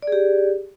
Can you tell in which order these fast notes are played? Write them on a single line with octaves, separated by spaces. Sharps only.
D5 G#4 G4